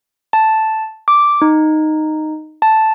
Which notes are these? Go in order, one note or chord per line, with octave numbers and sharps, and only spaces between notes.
A5
D6
D#4
A5